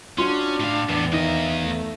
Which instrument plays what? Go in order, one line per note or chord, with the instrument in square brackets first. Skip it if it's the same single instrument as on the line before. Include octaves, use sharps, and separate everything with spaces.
[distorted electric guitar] C#4 [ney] D4 [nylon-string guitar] F4 F#4 C#5 [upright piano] C6
[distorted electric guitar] A2 F5
[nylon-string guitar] E2 [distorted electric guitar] A2 B3
[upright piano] D#3 [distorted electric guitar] A#3 D#5 [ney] E5
[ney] A3